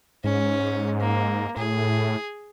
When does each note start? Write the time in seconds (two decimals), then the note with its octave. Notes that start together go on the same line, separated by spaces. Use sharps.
0.24 G#2 C#4
1.01 A#3
1.56 A2 G#4